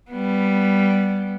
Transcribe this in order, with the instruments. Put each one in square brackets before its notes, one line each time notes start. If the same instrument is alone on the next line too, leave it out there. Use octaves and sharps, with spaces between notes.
[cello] G3 B3